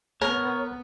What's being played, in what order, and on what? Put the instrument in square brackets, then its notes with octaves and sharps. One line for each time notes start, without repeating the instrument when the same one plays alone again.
[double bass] B3 [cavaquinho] A#4 [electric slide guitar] C#5